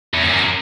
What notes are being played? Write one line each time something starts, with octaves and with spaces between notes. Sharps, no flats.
E2
F#2